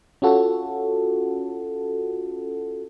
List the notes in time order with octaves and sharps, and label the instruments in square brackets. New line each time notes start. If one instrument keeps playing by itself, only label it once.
[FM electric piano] C#4 F4 F#4 A4